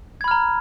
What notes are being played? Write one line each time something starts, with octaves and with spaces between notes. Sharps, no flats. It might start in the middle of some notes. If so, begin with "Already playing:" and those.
A#5 B5 F6 G#6